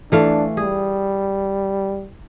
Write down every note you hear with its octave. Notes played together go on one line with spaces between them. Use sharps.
E3 A3 D4 F5
G3 G#4